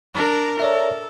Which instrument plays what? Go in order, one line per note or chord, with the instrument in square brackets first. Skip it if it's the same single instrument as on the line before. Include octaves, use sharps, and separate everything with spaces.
[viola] D4 A#5 [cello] A#4
[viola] A4 [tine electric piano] C#5 D5 E5